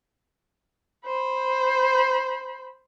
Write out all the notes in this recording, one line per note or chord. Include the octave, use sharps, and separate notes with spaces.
C5 B5